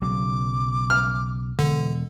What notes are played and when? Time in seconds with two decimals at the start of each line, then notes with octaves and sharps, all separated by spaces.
0.02 B1 C#3 F#3 D6
0.90 F6
1.59 E1 D3